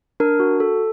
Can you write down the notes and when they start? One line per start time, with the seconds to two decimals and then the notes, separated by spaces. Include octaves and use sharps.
0.20 D4 A#4
0.40 F#4
0.60 A4